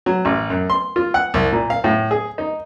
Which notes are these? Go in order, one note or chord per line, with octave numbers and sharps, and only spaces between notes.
F#3
A1
F#2
C6
F4
F#5
C2
A#2
F5
A2
G#4
D#4